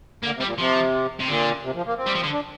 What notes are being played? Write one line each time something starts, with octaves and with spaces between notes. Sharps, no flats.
D3 A#3
C3
G3
A#2
C3 F3
C3
A#2 D3
C3
F3
A#3
C4
G3
F3
D3
D4